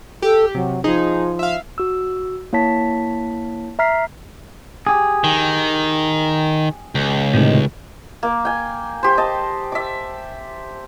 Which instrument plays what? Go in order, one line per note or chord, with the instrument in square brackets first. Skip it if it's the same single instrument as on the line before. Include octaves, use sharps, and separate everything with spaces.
[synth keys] G4 [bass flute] A4
[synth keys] C3 [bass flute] F#3
[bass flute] F3 [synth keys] D#4 G#4
[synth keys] E5 F5
[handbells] F#4 E6
A#3 E4 C#5 A5 B6
E5 A#5 F6 B6 C7
[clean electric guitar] G4 G#4
[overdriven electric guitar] D#3
C#2
[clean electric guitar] A2 C3 D#3
[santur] A#3
G5 G#5
G4 C5
D#5 A5
E5 D6